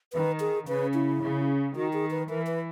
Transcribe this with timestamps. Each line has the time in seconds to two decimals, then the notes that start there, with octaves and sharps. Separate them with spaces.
0.13 D#3 B4
0.40 G#4
0.67 C#3 B4
0.94 E4
1.22 C#3
1.75 D#3 F#4
1.93 G#4
2.11 B4
2.29 E3 A#4
2.47 B4